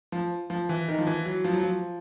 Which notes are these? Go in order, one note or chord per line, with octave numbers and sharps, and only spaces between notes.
F3
F3
E3
D#3
F3
E3
F#3
F3
F#3
F3